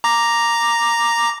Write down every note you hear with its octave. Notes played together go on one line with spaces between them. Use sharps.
A#5 D6 A#6